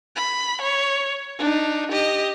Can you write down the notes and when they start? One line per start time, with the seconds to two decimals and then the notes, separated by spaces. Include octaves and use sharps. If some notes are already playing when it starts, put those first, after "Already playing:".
0.16 B5
0.61 C#5
1.39 D4 D#4
1.91 G4 D#5